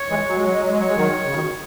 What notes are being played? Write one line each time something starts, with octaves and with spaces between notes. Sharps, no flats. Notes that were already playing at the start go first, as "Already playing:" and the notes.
Already playing: C#5
E3 G#3
F#3
G#3
F#3
G#3
F#3
G#3
F#3 C#5
G#3
D#3 F#3
C#3
B2 D#3